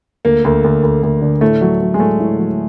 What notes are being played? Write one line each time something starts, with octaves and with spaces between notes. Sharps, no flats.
D2 A#3
D2
D2
D2
D2
D3
A2 A3
F#3
F#3
G#3
A2 A3
A2
F#3